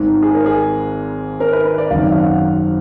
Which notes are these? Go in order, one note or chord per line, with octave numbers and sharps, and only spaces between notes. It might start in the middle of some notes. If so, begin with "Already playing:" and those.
Already playing: G#1 G#2 D#3
G#4
A#4
G#4
A#4
B4
B4
D5
G#1 F#2 D#3 F5
F5
F#5